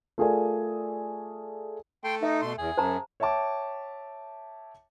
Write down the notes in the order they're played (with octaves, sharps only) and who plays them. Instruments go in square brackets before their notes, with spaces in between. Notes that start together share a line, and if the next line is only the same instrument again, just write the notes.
[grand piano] A3 F4 G#4 A#4 D5 G#5
[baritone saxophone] A3 [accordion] G5 C6
[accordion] D#4 [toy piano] E5
[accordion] B2 C6
[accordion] E2 [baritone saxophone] G#4
[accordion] F#2 [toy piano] C5 A5 A#5
[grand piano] C#5 E5 G5 A5 D6